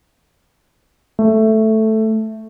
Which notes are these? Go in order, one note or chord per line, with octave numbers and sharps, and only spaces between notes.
A3